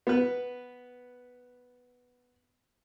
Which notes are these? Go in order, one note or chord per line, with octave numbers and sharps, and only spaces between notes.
B3 B4